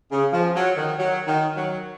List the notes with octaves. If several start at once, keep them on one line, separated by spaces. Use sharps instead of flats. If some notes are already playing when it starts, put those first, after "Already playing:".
C#3
F3
F#3
D#3
F#3
D#3
F#3